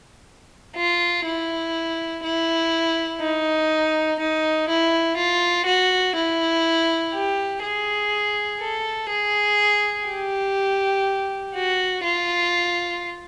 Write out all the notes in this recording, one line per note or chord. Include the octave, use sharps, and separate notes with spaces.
F4
E4
E4
D#4
D#4
E4
F4
F#4
E4
G4
G#4
A4
G#4
G4
F#4
F4